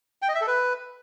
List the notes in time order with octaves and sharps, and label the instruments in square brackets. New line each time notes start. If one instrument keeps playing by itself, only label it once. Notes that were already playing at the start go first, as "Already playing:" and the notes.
[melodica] G5
D#5
E5
A4
B4